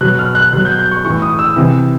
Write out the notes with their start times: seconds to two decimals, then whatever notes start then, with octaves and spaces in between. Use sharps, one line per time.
0.01 B2 F#3 F#6
0.19 F6
0.35 F#6
0.53 B2 F#3 F#6
0.65 G6
0.79 G6
0.91 C#6
1.05 A2 E3 C#6
1.22 D#6
1.39 E6
1.56 C3 E3